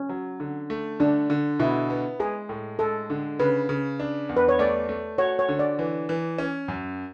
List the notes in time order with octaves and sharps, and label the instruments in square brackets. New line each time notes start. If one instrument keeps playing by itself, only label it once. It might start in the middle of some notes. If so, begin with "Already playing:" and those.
Already playing: [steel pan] C#4
[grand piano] F#3
D3
A3
[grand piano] D3 [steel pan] D4
[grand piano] D3
[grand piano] B2 [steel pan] E4
[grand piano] B3
[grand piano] G#3 [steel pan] G#4
[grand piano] A2
[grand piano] G#3 [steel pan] A4
[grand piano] D3
[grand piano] C#3 [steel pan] B4
[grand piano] C#3
D4
E2
[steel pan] B4
C#5
[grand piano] A3 [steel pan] D5
[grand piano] A3
[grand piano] F#4 [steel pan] C#5
[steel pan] C#5
[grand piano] D3
[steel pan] D5
[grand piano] E3
E3
C#4
F#2